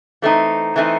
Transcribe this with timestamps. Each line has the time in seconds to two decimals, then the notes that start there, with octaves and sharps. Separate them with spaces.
0.22 E3 A3 C4 D#4
0.76 E3 A3 C4 D#4